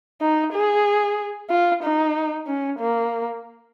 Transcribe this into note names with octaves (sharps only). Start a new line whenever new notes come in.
D#4
G#4
F4
D#4
C#4
A#3